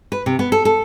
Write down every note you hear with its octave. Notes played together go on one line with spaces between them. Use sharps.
B4
C3
B3
A4
A4